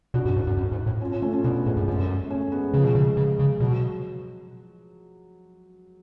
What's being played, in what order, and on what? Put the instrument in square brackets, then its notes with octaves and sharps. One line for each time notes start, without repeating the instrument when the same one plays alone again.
[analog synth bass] B2 [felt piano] D4 F#4
[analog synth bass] F#2
G#2
F#2
F#2
G#2
A2
[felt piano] C#4 F4
C#4 F4
A3 C#4
C#4 F4
[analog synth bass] B2 [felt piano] B3 D4
[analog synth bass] A2 [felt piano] G#3 B3
[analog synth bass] F#2
[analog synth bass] F#2 [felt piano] A3 C#4
[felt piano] A3 C#4
G#3 B3
[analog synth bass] C#3 [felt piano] F3 G#3
[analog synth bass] B2
C#3
C#3
C#3
[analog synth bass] B2 [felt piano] F#3